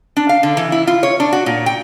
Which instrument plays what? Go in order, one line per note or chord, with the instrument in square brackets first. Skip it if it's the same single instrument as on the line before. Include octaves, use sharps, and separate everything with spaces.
[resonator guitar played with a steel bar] D4
F5
D3
E3
E4
F4
C#5
D4
F#4
A#2
G5